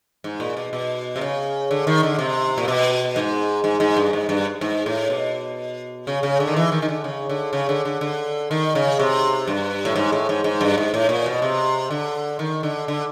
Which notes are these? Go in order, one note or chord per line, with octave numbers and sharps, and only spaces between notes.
G#2
A#2
B2
B2
C3
C#3
D3
D#3
D3
C3
A#2
B2
G#2
G#2
G#2
G2
G#2
G2
G#2
A2
B2
C#3
C#3
D3
D#3
E3
D#3
D#3
D3
C#3
D3
C#3
D3
D3
D3
D#3
C#3
C3
G2
A2
G#2
A2
G#2
G#2
G2
G#2
A2
A#2
B2
C3
D3
D#3
D3
D3